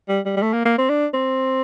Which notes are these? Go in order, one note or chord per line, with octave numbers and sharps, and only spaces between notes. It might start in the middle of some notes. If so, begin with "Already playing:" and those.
G3
G3
G3
A3
A#3
A#3
C4
D4
C4